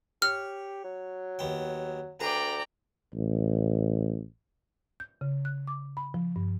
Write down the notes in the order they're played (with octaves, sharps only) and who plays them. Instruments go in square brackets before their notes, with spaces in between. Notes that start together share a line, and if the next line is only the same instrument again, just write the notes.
[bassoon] G4 [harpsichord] C#5 [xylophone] F6
[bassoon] F#3
[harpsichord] D#2 B3 G5
[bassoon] D2 [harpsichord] G#4 B4 [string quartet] D5 G5 A#5
[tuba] A1
[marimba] G6
C#3
F#6
D6
B5
F3
G2